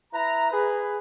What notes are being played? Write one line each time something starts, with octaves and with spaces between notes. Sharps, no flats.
E4 B4 A#5
G#4 B4